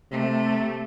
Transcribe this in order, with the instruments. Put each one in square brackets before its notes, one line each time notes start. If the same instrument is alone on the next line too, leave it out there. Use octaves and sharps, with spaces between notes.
[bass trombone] C3 [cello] A3